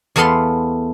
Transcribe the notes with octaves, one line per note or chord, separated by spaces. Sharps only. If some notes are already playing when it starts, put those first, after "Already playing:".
E2 A3 B3 A4 F5 C6